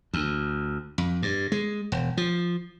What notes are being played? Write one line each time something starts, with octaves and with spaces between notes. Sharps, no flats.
D2
F2
G2
G#3
E1
F3